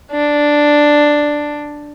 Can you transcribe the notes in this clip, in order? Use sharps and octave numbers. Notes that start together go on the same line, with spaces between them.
D4